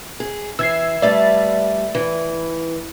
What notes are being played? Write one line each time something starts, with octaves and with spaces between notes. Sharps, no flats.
G#4
E3 E6 G#6 C7
G3 A3 B4 D5 E5 A6
E3